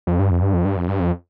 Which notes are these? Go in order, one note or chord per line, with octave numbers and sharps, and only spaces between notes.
F2
G2
F2
G2
F2
G2
F2
G2
F2